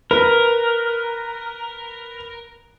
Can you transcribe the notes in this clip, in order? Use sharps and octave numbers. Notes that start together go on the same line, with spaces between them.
A#4 B4